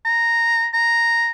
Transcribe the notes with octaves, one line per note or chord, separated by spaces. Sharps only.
A#5
A#5